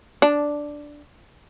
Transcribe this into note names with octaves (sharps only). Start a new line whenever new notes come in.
D4